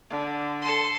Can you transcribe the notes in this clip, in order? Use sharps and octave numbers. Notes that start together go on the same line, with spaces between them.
D3
A4 C6